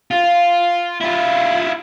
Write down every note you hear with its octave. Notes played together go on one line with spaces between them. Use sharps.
F4
E4 F4